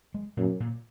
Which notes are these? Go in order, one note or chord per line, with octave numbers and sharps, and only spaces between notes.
G#3
F#2 A#2
A#2